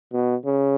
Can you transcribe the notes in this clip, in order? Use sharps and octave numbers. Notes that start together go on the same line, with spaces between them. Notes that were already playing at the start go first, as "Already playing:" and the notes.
B2
C#3